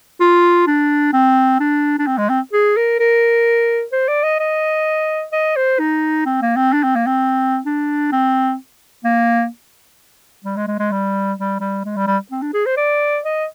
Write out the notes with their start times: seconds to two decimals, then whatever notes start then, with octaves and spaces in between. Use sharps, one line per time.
0.20 F4
0.67 D4
1.13 C4
1.60 D4
1.99 D4
2.07 C4
2.18 G#3
2.29 C4
2.53 G#4
2.76 A#4
2.99 A#4
3.92 C5
4.08 D5
4.23 D#5
4.40 D#5
5.32 D#5
5.56 C5
5.79 D#4
6.25 C4
6.41 A#3
6.56 C4
6.73 D4
6.83 C4
6.95 A#3
7.06 C4
7.66 D4
8.12 C4
9.04 A#3
10.44 G3
10.56 G#3
10.67 G#3
10.79 G#3
10.91 G3
11.38 G3
11.60 G3
11.85 G#3
11.96 G3
12.07 G3
12.31 C4
12.42 D4
12.53 G#4
12.66 C5
12.77 D5
13.24 D#5